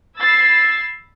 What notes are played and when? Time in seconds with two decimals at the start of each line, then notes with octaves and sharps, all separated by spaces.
0.19 B5 E6 G#6 A6 C7